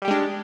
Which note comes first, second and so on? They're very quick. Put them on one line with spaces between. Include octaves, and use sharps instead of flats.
G3 G4 G#3 D4